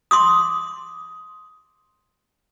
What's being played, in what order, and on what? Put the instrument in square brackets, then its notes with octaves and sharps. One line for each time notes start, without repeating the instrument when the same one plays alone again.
[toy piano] C6 D6 D#6